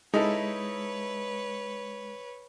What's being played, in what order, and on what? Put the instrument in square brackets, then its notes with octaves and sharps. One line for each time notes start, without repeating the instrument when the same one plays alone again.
[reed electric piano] G#3 [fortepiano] D#4 E4 A4 [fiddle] B4 C#5